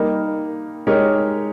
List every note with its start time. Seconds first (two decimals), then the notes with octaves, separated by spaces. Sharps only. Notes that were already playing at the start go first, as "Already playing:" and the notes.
Already playing: G3 A#3 D#4 A#4
0.87 G#3 D#4 G4 A#4 C#5